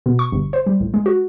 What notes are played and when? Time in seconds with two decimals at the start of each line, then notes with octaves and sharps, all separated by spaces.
0.06 B2
0.19 C#6
0.32 G1
0.53 C5
0.66 G3
0.80 A1
0.94 G#3
1.06 F#4